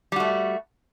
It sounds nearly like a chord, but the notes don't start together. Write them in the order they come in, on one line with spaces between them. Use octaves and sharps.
G3 F#4 A3